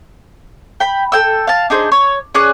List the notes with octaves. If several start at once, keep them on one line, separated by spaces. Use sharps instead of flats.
G5 B5
A4 G5 E6
F5 A5
D4 D#4 G#4 C5
C#5
C#4 G#4 D5 F#6